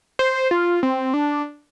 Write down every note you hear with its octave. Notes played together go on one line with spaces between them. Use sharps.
C5
F4
C4
D4